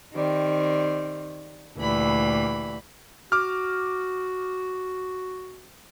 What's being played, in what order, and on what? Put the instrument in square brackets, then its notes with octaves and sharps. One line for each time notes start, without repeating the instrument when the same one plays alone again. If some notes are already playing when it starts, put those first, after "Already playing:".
[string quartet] D#3 G3 C4
D2 A#2 E3 G3 B5
[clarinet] F#4 [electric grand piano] D6 F6